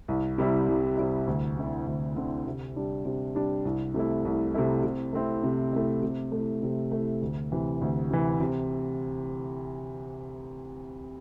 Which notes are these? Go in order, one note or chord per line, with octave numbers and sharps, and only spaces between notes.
C2
C3 G3 E4
C2
C3 G3 E4
D2
D3 C4 E4
D2
D3 C4 E4
C3
G3 D4
C3
G3 D4
C2
C3 A3 E4
C2
C3 A3 E4
C3
A3 C4 E4
C3
A3 C4 E4
C3
A3 E4
C3
A3 E4
D2
C3 E3
D2
C3 E3
C3